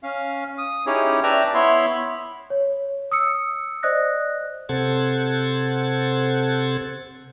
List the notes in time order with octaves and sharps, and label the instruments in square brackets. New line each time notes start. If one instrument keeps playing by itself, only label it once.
[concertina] C#4 F5
D#6
C#4 D#4 E4 G4 G#4 C#5
B4 D5 E5 G5 A5 A#5
B3 E4 C#5 E5 B5 C6
B5
[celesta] C#5
D#6 E6 C#7
C5 D5 D#5 D#6 F#6 A#6
[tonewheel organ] C3 A4 C5 F#5 G#6 A6